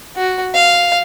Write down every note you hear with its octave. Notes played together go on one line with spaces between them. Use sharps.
F#4
F5